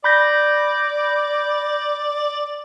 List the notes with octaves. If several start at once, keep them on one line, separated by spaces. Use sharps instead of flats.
D5 B5 G6 A#6